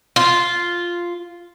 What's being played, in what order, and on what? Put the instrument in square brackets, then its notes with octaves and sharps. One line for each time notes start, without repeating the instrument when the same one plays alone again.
[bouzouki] F4